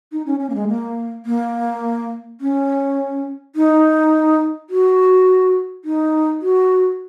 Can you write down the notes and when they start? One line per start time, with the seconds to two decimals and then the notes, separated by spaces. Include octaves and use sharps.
0.12 D#4
0.26 C#4
0.40 C#4
0.49 A#3
0.55 G#3
0.68 A#3
1.26 A#3
2.41 C#4
3.56 D#4
4.70 F#4
5.85 D#4
6.42 F#4